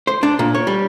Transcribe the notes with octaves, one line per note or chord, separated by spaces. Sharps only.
C5
D4
A#2
C#5
G3